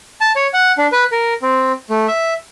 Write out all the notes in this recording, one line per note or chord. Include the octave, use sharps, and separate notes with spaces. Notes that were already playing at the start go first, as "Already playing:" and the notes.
A5
C#5
F#5
D4
B4
A#4
C4
A3
E5